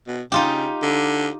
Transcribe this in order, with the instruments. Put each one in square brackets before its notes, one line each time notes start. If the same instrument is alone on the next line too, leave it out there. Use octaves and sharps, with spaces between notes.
[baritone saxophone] B2
[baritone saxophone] C#3 [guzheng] D#4 F4 G4
[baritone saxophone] D3